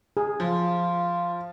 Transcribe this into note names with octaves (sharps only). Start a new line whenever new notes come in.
G#4
F3 F4